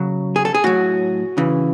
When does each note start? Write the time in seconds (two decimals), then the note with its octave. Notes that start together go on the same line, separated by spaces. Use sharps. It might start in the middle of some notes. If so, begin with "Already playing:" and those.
Already playing: C#3 F#3
0.36 G#4
0.45 A4
0.54 G#4
0.64 A2 F#3 F#4
1.38 C#3 E3